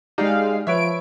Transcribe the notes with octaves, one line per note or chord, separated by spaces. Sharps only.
G#3 D#4 G4 D5 F5
F3 B4 C#5 E5 D7